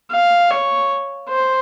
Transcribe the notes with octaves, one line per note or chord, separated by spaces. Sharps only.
F5
C#5
C5